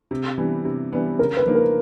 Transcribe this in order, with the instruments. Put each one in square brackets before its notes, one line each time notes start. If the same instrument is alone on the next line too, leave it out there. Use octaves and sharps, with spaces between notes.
[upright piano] C3
E3 G3 B3 D4
C3
E3 G3 B3 D4
[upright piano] C#3 [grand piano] A#4
[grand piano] B4
[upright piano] F3 A#3 D#4
[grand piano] A#4